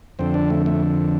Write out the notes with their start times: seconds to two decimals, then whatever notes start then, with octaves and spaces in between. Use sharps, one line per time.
0.19 F2 D3 C4
0.34 D4
0.50 A3
0.66 A3